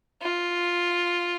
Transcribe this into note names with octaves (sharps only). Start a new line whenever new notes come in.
F4